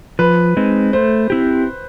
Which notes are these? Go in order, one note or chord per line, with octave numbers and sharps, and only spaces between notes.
F3 B4
G#3 C4 D#4
A3 C5
C4 E4 G4